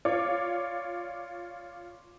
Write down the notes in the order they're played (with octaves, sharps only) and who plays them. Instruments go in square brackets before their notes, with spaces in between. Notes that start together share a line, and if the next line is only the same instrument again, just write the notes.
[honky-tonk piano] F4 C#5 D5 D6